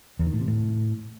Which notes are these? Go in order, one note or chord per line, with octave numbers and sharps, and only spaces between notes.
E2
D#3
A2
C3
A2